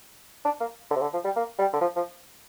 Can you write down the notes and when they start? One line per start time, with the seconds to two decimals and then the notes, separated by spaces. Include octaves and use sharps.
0.45 D4
0.60 A#3
0.91 D3
0.96 C3
1.02 D3
1.13 F3
1.25 G3
1.36 A#3
1.59 G3
1.73 D3
1.81 F3
1.96 F3